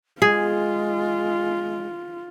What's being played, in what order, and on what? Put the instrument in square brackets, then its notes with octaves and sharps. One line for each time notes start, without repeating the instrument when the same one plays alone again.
[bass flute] G#3 [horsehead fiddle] F4 [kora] G#4